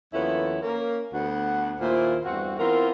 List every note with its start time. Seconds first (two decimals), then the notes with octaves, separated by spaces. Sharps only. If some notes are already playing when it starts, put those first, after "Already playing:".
0.14 D#2 F3 B3 C#4 E4 A4
0.62 A#3 C#4 A#4
1.14 D2 B3 F#5
1.81 D#2 A#2 A#3 E4 C5
2.25 E2 G2 A3 C4 F#4
2.59 E3 B3 C4 F4 A#4